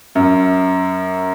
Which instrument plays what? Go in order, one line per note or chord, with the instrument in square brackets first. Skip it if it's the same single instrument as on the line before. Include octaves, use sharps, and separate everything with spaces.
[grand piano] F#2